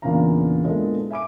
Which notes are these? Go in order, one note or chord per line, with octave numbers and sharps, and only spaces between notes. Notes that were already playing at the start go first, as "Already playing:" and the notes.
E2 A#2 C#3 D4 F5 A#5
A#2 G#3 B3 D4 E4 A4
E5 G#5 D6 D7